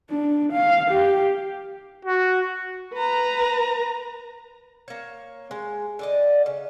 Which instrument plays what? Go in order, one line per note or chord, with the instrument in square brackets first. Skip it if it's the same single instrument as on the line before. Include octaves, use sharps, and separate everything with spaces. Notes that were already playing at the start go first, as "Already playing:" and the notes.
[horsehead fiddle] D4
F5
G4
[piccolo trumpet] F#4
[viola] B4 A#5
[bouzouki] A#3 C#5
G#3
D3 D5 D#5
C#3